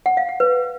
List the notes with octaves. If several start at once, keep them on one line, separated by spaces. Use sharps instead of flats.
F#5
F5
F#5
B4